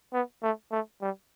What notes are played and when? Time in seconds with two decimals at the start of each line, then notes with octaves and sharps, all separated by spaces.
0.13 B3
0.43 A3
0.72 A3
1.01 G3